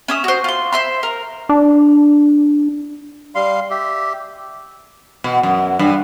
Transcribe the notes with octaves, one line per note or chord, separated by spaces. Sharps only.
C#4 E5 D#6
F#4 C5
F4 C6
C5 E5 C6
A#4
D4
G3 F5 C6
G4 E5
B2
F#2
G2